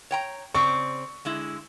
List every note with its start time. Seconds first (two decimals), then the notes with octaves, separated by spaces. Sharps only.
0.11 C#5 G5 A#5
0.55 C#3 C4 D5 C#6
1.25 D3 G#3 E4